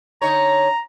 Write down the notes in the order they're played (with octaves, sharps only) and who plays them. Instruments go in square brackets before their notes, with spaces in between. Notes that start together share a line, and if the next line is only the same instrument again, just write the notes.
[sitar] D3 D#4 C#5 [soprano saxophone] A#5